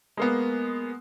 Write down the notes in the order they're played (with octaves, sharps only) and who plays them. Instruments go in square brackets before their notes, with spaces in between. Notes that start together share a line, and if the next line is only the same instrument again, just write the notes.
[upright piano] G#3 A#3 B3